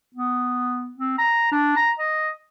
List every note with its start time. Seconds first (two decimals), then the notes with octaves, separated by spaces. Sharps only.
0.14 B3
0.98 C4
1.18 A#5
1.52 D4
1.76 A#5
1.99 D#5